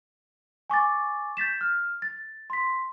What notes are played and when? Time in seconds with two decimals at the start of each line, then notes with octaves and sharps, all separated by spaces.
0.70 G#5 C#6 D6 A6
1.37 G6 A6 B6 E7
1.61 F6
2.02 A6
2.50 C6 B6